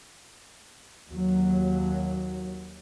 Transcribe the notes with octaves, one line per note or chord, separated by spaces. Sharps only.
D#2 F#3